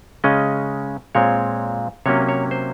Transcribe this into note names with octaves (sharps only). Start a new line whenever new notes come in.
C#3 G#3 C#4 D#5
A#2 G#3 C4 C#5
C3 F#3 A#3 C#4 C#5
C#5
C5